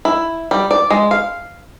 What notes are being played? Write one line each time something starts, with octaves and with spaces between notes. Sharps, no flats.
E4
G3
D5
G#3
F5